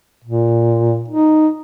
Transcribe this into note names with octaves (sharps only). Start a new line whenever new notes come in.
A#2
D#4